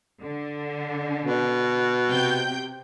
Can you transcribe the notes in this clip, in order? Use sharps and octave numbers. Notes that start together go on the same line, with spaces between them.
D3
B2
C3 G5 G6